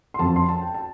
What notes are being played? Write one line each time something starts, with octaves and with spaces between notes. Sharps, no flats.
C6
F2 F3 C4 A5
C6
A5
G5
A5